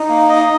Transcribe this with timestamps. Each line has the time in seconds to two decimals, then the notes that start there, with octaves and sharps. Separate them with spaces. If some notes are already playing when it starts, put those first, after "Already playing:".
Already playing: D#4
0.09 A#3
0.29 D#5